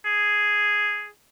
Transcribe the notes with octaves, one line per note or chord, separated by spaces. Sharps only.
G#4